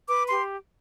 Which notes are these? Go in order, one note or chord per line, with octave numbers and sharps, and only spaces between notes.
B4 D6
G4 C6